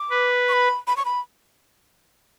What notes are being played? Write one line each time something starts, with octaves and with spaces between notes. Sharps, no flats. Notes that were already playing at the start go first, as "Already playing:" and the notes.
Already playing: D6
B4
C#6
B5
B5
C#6
B5